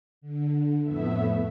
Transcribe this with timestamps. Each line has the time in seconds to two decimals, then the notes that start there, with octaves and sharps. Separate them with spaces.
0.21 D3
0.83 F2 A2 A3 B3 E5